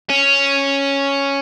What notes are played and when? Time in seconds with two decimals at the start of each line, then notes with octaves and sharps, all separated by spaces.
0.10 C#4